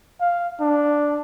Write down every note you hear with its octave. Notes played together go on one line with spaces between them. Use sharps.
F5
D4